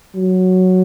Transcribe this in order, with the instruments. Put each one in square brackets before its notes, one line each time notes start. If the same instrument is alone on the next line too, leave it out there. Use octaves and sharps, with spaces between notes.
[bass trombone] F#3